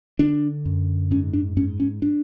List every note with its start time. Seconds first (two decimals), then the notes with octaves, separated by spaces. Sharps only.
0.19 D3 D4
0.65 F#2
1.11 G#2 C#4
1.33 D4
1.57 G#2 C#4
1.80 C#4
2.02 D4